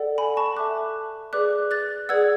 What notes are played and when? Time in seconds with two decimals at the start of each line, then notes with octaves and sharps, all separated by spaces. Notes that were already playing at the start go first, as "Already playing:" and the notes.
Already playing: A4 D5 F#5
0.18 G#5 B5
0.37 A5 C#6
0.56 A4 E5 D6 F#6
1.33 G#4 B4 D5 D6 F#6
1.71 F#6 A6
2.09 G#4 B4 D5 F#5 E6 G#6